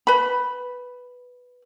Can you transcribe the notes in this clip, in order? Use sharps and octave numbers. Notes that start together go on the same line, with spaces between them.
B4 B5